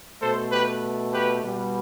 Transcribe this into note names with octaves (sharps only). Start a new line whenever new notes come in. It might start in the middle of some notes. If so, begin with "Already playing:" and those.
B2 A3 A4 C5
G4 B4
G4 B4
B2 G3